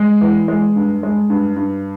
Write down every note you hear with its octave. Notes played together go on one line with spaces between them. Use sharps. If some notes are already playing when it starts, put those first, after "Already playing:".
Already playing: G#3
E3
G#3
G2
G#3
G2
G2